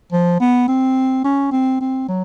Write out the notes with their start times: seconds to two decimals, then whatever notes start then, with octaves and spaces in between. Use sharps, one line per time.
0.12 F3
0.40 B3
0.68 C4
1.25 C#4
1.52 C4
1.81 C4
2.08 F#3